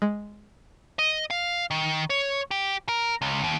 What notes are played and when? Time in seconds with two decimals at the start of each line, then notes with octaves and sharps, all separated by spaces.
0.02 G#3
0.99 D#5
1.30 F5
1.71 D#3
2.10 C#5
2.51 G4
2.89 A#4
3.22 C#2
3.44 D#2